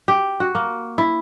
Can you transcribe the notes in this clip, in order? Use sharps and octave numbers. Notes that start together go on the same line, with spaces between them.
G4
F#4
A#3
E4